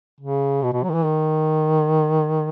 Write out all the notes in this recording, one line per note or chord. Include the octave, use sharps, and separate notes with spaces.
C#3
B2
B2
F#3
D#3
E3
D#3